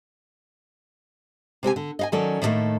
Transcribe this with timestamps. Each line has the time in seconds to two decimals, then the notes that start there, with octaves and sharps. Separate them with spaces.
1.63 C3 C4 G4 G#5
1.76 D3
1.99 D#5 F5 G#5
2.12 D#3 F#3 C#4 A4 D5
2.42 A2 D#3 F#3 G3 A3 A#3